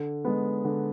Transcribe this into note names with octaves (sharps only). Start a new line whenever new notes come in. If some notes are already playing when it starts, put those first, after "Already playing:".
Already playing: D3
G#3 B3
D3